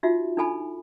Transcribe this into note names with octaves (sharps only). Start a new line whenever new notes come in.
D#4 F4 F#4 E5
D4 D#4 A4 G#5 B5